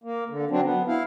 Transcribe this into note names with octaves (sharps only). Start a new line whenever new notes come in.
A#3
D3
F#3 C4 D4
B3
E4 F5